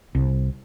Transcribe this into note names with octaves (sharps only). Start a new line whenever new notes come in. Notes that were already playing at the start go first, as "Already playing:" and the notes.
C2